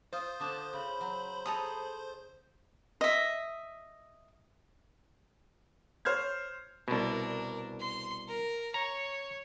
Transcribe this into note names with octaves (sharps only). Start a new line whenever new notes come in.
F4 C5 D#6
D3 D4 A5 D#6
C#3 B5
F#3
G#4 A4 A#5 D#6
D#5 E5
C5 C#5 F6 G#6
C2 B2 D4 A#4
C6
A#4
C#5 A#5